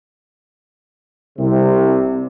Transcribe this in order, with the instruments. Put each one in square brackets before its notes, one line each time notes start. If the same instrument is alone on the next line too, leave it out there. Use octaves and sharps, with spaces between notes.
[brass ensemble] C2 C3